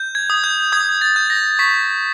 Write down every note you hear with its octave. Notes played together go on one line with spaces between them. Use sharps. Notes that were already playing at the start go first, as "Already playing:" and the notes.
Already playing: G6
G#6
D#6
G6
D#6 G#6
A6
G6
A#6
C#6 B6